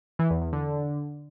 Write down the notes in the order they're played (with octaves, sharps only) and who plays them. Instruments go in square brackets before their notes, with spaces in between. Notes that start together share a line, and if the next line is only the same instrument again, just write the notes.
[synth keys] E3
E2
E2
D3